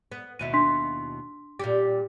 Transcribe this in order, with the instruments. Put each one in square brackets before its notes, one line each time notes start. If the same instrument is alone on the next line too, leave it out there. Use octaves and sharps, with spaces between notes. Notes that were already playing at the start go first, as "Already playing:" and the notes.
[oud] B3
[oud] D#2 B2 E4 [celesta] D#7
[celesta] D4 C6 B6
[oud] A#2 G3 G4